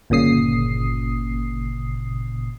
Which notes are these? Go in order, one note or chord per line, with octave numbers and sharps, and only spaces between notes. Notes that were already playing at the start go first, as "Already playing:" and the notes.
G1 A#2 C#3 D#6 C7